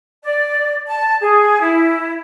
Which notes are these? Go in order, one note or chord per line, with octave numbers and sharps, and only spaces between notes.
D5
A5
G#4
E4